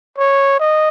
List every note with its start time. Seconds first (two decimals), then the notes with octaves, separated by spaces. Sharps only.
0.18 C#5
0.59 D#5